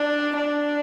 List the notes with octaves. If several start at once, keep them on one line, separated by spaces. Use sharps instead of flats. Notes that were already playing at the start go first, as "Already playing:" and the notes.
Already playing: D4
D4